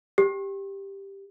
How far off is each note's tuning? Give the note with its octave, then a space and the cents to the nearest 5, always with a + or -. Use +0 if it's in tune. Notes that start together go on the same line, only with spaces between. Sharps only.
G4 +5